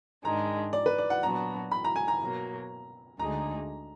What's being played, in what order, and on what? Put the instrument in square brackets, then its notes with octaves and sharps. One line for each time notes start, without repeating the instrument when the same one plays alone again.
[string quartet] G#2 D#3 G#3 D4 [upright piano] A#5
[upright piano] D5
B4
D5
F#5
[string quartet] A#2 F#3 B3 D4 F#4 [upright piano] A#5
[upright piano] B5
A#5
G#5
A#5
[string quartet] B2 F#3 A#3
[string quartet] D2 D3 G#3 D#4 G#4 [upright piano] A#5